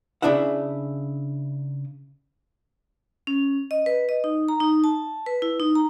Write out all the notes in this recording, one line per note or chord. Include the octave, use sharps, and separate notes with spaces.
C#3 A3 D4 E4 E5 F#5
C#4
D#5
B4
D#5
D#4
A#5
D#4
A5
B4
E4
D#4
A#5